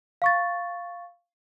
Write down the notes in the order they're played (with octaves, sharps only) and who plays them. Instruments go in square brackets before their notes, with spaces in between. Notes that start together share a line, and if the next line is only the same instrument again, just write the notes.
[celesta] F5 C#6 A6